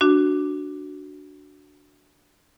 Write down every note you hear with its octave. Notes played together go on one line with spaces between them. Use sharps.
D4 F#4